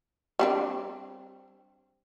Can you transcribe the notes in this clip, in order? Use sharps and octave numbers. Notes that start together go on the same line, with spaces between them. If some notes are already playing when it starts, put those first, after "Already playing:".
G3 C4 D4